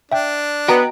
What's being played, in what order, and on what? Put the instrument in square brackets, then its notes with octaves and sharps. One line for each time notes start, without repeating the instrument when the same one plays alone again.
[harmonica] D4 [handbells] E5 G5
[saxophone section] B3 [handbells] F#4 [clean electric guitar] D#5 G5 A#5